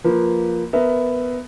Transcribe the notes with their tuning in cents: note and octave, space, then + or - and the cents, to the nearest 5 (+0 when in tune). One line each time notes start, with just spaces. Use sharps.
F3 +0 A#3 +0 B4 +0
B3 +10 A#4 +0 E5 +0